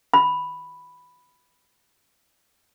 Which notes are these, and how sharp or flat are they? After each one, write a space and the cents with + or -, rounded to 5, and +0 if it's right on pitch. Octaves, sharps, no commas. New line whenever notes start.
B5 +0